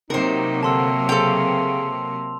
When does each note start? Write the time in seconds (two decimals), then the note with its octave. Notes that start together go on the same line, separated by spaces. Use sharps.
0.10 C3 F#3 A#3 D#4 A#4 C5
0.63 D3 A5 C6 E6
1.09 C#3 A4 G5 C6 F7